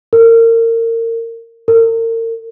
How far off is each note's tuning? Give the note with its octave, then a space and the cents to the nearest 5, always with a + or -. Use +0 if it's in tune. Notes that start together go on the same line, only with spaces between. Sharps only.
A#4 -30
A#4 -40